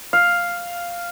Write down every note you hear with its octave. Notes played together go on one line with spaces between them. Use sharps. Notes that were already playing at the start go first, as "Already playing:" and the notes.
F5